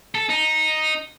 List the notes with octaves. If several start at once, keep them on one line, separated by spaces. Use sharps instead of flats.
A4
D#4